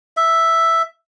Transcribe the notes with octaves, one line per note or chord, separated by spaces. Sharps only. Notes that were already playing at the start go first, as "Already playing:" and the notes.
E5